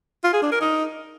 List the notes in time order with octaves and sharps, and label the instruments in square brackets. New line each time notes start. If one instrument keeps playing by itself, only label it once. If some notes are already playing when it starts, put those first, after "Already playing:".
[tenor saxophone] F4
G#4
D4
A#4
D#4